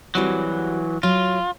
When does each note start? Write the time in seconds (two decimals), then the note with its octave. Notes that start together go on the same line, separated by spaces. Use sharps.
0.15 E3 F#3 G3 C4 F#4
1.03 F#3 F4